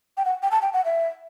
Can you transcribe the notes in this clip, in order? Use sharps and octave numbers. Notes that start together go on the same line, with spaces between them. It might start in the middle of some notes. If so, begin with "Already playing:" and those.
G5
F#5
G5
A5
G5
F#5
E5